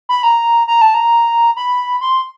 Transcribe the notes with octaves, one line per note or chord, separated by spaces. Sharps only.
B5
A#5
A#5
A5
A#5
B5
C6